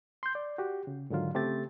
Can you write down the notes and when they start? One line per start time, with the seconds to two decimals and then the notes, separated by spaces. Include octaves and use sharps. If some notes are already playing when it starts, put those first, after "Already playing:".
0.23 C6 G6
0.35 D5
0.58 F#4 G4
0.87 C#3
1.10 G#2 D3 D#3 F#3 F4
1.34 C#3 A3 C4 G4 C5 A6